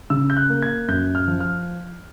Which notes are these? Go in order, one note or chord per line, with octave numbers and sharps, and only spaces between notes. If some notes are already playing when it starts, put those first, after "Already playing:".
C#3 E6
G6
F#6
A#3
G#6
F#2 G6
F6
F3
F6